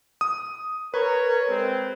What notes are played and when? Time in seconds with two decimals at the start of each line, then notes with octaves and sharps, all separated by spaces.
0.21 D#6
0.94 A#4 B4 C#5
1.50 G#3 C4